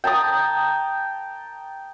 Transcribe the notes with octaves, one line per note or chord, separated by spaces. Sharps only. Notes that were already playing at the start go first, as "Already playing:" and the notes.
G5 A5 A#5 D#6